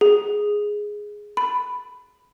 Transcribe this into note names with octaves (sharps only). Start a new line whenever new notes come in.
G#4
B5